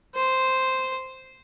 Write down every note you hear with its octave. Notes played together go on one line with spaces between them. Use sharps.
C5